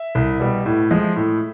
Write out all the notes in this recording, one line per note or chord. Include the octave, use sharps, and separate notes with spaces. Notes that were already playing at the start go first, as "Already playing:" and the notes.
Already playing: E5
C2
B2 G3
A2
F3 G#3
A2